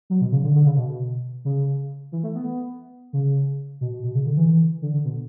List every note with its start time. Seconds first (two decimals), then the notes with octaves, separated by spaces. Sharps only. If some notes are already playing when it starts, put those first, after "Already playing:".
0.10 F#3
0.21 B2
0.32 C#3
0.44 D3
0.55 D3
0.66 C#3
0.77 B2
1.45 C#3
2.12 E3
2.23 A3
2.35 B3
3.13 C#3
3.81 B2
3.92 B2
4.04 B2
4.15 C#3
4.26 D3
4.37 E3
4.48 E3
4.82 D3
4.94 D3
5.05 B2